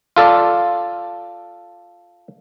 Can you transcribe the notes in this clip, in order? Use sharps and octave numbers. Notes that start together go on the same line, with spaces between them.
F4 A4 D5